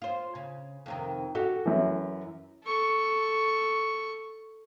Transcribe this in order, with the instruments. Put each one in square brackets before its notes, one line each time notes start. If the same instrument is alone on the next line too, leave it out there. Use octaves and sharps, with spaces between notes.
[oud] F4 C5
C#3
F2 C3 D#3
[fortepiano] F#4 [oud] G4 A4
[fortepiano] F#2 E3
[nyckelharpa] A4 C#6